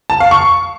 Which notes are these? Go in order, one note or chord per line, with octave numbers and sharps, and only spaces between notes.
A5
F5
C#6